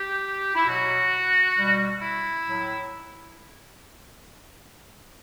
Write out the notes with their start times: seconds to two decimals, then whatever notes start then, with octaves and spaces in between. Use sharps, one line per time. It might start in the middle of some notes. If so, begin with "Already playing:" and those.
Already playing: G4
0.55 E4
0.65 B2 F#3 F#4
1.56 B2 G3
2.01 E4
2.45 A2 F#3